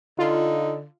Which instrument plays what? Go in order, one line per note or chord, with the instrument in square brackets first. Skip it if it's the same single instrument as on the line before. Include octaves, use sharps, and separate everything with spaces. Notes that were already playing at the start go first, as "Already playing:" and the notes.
[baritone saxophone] D3 [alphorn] D#4 [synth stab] F4